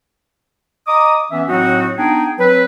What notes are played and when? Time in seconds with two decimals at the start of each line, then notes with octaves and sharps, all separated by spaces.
0.87 D#5 A#5 D6 D#6
1.31 E3 B3 C#4 E5
1.48 A2 F#3 C4 D#4 F#4
1.98 B3 D4 D#4 G#4 G5
2.39 F#3 C4 B4